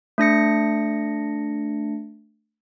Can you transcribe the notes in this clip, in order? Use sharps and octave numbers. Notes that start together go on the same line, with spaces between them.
A3 D4 A#6 C#7